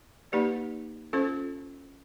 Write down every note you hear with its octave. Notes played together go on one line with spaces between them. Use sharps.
A#3 D#4 G4 B4 D5
C#4 F4 A4 C5